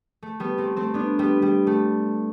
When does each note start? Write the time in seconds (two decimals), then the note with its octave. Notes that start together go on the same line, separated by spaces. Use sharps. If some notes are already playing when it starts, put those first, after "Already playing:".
0.22 A3
0.40 G3 B3
0.58 A3 C4
0.76 A3 C4
0.94 B3 D4
1.19 G3 B3
1.42 G3
1.67 A3